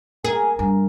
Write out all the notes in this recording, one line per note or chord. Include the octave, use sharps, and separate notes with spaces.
G#4 A#4 G#5
G2